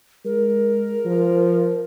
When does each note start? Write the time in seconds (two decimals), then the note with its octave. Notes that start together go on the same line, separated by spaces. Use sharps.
0.25 G#3 A#4
1.05 F3